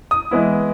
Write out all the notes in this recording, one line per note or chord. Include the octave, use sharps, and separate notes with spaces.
D#6
E3 G#3 B3 E4